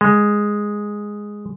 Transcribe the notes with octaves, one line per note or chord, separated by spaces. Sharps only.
G#3